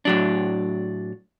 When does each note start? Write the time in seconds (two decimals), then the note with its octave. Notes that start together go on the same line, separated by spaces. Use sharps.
0.05 A2 F#3 D4